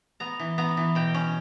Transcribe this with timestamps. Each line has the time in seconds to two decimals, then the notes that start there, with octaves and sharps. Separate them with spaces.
0.20 B3 A#5
0.40 E3
0.58 B3 A#5
0.77 E3
0.95 B2 G5
1.14 C#4